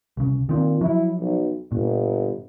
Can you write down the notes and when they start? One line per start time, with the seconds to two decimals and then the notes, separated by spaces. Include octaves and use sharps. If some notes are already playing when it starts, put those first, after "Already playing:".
0.17 C2 C#3
0.49 A#2 D#3 C4
0.81 F3 F#3 E4
1.19 B1
1.72 G1 A#2